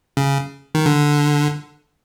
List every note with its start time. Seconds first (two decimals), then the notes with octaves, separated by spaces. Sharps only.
0.17 C#3
0.75 D#3
0.86 D3